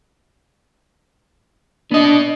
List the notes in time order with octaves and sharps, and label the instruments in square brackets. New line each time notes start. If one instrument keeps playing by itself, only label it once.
[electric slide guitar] B3 D#5 [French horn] D4